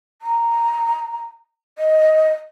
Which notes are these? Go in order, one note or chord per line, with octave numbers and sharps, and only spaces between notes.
A#5
D#5